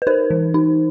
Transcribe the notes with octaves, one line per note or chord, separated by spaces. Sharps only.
B4
D#4 A#4 C5
E3
D#4